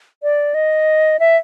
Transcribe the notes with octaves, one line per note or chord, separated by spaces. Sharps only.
D5
D#5
E5